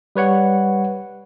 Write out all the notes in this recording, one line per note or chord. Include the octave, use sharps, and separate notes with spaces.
G3 B4 C#5 F#5